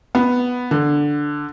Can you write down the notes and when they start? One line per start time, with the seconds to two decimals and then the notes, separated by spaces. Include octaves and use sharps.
0.15 B3
0.71 D3